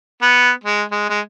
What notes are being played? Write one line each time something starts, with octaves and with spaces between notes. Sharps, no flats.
B3
G#3
G#3
G#3